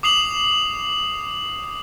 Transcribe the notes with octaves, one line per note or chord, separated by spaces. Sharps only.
D6 D#6 C7 F7 F#7